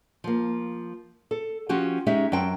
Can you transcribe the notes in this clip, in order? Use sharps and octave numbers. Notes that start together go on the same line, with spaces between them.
F3 A#3
A4
F3 C#4 F#4 G4
G#3 C#4 D#4 G4 E5
F#2 C4 G5 A5